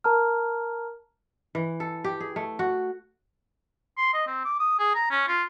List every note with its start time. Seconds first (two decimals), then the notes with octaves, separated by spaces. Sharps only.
0.04 A#4 A5 A#5 F6
1.55 E3
1.80 A4
2.04 G4
2.21 G#4
2.36 A3
2.59 F#4
3.98 C6
4.14 D#5
4.27 C4
4.45 D6
4.60 D#6
4.79 G#4
4.95 A#5
5.11 C#4
5.28 F4